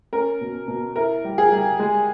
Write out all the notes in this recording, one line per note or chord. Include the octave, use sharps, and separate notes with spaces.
C#4 A#4
B2
B2
E4 A#4
G3
G#4
G3
G#3